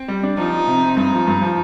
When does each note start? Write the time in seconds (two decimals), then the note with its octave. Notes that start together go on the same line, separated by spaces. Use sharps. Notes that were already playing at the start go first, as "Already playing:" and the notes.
Already playing: C4
0.08 G3
0.23 D4
0.37 F3 D#4
0.53 F3
0.67 C3
0.82 C4
0.97 G2 D#4
1.13 F3
1.27 G2
1.42 F3